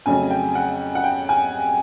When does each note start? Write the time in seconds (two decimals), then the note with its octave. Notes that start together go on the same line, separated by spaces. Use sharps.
0.06 F2 C#3 F#3 A3 C#4 G#5
0.30 G5
0.55 F#5
0.95 F#5
1.04 G5
1.29 G#5